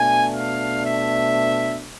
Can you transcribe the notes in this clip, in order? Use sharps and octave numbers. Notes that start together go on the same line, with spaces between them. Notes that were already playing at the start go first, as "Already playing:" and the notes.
Already playing: B2 A3 D4 G#5
F5
E5